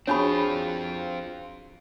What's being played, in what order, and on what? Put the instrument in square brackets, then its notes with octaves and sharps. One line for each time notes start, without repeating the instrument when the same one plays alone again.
[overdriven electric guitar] C4 F4 [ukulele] D4 F#4 G#4 [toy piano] C#5 G#5 B5